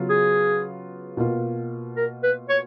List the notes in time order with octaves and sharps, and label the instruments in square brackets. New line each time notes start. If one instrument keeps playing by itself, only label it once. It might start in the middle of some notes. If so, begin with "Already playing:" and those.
Already playing: [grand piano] C#3 F#3 B3 F4
[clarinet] G#4
[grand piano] B2 A#3 F4
[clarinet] A#4
B4
C#5